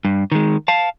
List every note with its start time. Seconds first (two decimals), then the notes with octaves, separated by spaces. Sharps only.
0.05 G2
0.32 D#3 G#3
0.68 F5 A5